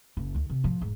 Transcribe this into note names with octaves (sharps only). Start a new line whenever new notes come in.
F#1
D2 D#3
C3
A1 F3
E1 G#2